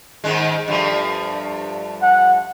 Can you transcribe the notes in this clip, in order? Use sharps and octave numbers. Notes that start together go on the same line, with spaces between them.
G#2 D#3 G#3
G2 F3 A3
F#5